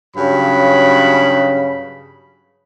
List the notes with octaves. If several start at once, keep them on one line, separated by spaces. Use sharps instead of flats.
G2 C#3 F#3 B5